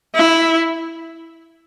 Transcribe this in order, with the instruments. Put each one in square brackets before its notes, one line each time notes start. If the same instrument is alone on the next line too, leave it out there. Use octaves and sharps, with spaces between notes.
[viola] E4